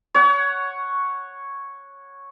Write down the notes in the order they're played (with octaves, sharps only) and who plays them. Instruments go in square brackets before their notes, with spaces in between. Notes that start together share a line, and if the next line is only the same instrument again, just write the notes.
[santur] C#5 F#5